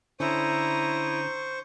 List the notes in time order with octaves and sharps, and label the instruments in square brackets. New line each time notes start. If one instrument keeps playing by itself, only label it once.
[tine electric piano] D3 C#4 D4 [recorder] E4 [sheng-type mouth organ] C5 C#6 [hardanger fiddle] A#5 D#6